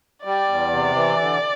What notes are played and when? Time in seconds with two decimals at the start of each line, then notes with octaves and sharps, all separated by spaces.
0.24 G3 D5
0.48 E2
0.72 C3
0.95 E3
1.18 D3